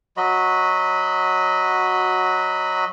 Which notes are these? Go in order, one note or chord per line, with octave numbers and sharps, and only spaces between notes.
F#3 F#4 D#5 B5